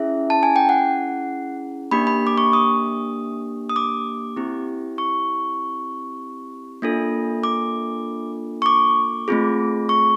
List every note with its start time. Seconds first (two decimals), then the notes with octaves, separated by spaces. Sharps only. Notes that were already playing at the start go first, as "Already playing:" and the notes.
Already playing: C#4 E4 G#4 E5
0.30 A5
0.43 G#5
0.56 G5
0.69 F#5
1.91 A#3 D4 G4 B5
2.07 B5
2.27 D6
2.38 C#6
2.53 D#6
3.69 D#6
3.76 D6
4.36 C4 E4 G4
4.98 C#6
6.82 A#3 D4 F4 A4
7.44 D6
8.62 C#6
8.66 D6
9.28 A3 C4 F4 G#4
9.89 C#6